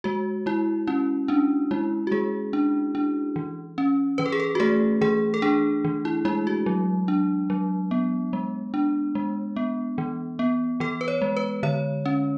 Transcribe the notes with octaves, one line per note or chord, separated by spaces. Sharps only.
G#3 F#4
G#3 E4
C#4 E4
C#4 D4
G#3 E4
F#4
G#3 G#4
D4
D4
E3
C#4
E3 B4
A4
G#4
A4
F#4
A3 G#4
E3 G#4
A4
D4 G#4
E3
E4
G#3 E4
F#4
F#3
D4
F#3
B3
G#3
D4
G#3
B3
E3
B3
E3 A4
B4
C#5
G#3
B4
D3 C#5
C#4